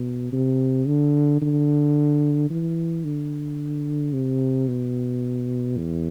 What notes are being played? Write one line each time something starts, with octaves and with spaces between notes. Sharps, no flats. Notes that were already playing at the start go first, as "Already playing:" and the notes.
Already playing: B2
C3
D3
D3
E3
D3
C3
B2
E2